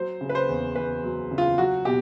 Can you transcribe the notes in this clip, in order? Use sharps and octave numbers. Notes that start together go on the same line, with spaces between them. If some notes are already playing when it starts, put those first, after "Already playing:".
Already playing: F#3 C5
C#3
B4
C5
E2
E2 B4
F#3
C#3
F4
F#3 F#4
B2 G4